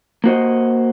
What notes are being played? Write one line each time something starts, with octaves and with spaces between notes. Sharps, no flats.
A#3 F#4 C5 D#5